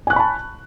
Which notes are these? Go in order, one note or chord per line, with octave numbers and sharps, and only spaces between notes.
G#5 A5 B5 C#6 F#6